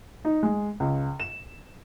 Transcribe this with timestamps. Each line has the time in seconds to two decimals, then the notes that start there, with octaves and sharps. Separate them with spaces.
0.25 D#4
0.43 G#3
0.80 C#2
1.20 E7